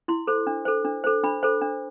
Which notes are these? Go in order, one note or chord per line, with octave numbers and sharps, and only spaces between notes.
E4 C6
A4 C5
D4
A4 C5
D4
A4 C5
D4 B5
A4 C5
D4